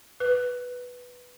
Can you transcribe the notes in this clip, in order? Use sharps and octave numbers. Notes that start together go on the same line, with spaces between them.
B4